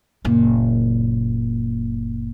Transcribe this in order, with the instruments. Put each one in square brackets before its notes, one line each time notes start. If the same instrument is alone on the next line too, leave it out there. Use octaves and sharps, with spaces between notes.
[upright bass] F#1 A#2